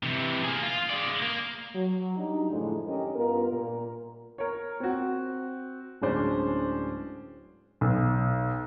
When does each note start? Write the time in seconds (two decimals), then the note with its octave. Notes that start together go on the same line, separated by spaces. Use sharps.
0.03 C3 E3
0.44 A#3 G#4
0.63 F4
0.90 G#3 D5
1.22 A#3
1.75 F#3
2.17 G3 D4 D#4
2.50 F#2 A2 D3 F3 G#3
2.87 C#4 D4 G4 A#4 D#5
3.16 G2 B3 F4 A#4
3.52 A#2 A#4
4.38 A#4 C#5
4.80 C4 F#4
6.02 D1 G#3 C#4 D4 C5
7.81 B1